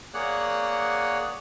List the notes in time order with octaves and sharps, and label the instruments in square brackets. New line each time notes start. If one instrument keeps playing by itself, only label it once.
[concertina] A#3 G#4 C#5 D5 F#5 F#6